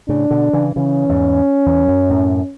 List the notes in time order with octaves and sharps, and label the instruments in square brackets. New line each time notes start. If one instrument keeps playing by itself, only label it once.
[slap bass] A2 C#3 [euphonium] D4
[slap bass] B2 D3
C#3 E3
[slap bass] C#3 E3 [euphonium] C#4
[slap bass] E2 G#2
E2
F#2
F#2 A2